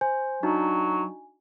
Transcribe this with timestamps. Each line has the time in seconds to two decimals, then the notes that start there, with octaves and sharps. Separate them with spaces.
0.01 C5 G#5
0.43 F#3 D4 D#4 F#4